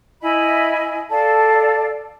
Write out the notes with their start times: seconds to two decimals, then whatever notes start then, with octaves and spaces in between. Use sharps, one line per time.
0.22 E4 D#5 G#5 B5
1.10 A4 D5 F5 A5